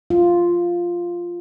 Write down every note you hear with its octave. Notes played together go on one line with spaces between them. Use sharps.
F4